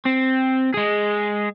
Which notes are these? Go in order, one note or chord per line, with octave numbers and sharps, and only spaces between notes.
C4
G#3 G#4